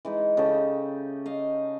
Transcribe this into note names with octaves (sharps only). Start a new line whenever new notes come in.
E3 G#3 D#4
C#3 G4 A4 D#5
D#5 F5